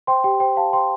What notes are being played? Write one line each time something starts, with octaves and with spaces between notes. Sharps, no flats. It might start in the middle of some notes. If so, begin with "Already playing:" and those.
C5 G5 C6
G4 G5
C5 G5
G4 F5 A5
C5 G5 C6